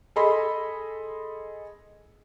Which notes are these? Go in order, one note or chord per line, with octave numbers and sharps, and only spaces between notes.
G#4 A4 D#5 B5 C6